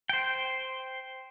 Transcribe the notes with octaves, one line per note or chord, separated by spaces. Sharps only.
C5 G5